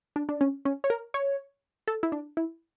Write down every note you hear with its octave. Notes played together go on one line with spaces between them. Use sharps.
D4
D4
C#4
C#4
C#5
A#4
C#5
A4
E4
D4
E4